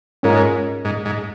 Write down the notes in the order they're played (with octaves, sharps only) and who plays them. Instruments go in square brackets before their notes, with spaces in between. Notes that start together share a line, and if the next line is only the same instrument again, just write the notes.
[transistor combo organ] G#2 [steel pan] C#4 F4 A#4
[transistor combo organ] G#2
G#2